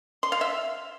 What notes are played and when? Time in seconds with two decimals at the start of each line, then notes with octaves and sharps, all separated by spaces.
0.23 C6
0.32 F5
0.41 E5